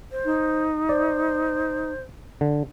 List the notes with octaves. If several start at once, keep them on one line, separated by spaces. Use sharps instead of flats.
C5
D#4
C5 D5
D3